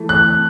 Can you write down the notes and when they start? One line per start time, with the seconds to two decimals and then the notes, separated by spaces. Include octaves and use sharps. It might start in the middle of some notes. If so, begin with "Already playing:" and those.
Already playing: E3 A3
0.09 F#6